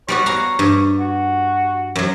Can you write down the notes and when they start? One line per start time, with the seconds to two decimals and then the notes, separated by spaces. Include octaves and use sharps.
0.08 G3 B3 F#4 C#5
0.26 F#4 F5 A#5
0.59 G2
1.00 F#4
1.96 F#2 F#3